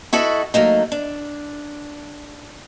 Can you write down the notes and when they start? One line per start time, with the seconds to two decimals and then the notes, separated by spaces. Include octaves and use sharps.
0.13 E4 F#4 A4 D#5
0.54 F#3 A3 A#3 D#4
0.92 D4